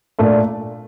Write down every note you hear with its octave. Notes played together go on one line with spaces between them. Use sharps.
A#2 A3 D4